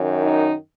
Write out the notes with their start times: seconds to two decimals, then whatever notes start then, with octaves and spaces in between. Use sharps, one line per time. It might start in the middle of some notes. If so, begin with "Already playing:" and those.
Already playing: F#2 D#3
0.23 D#4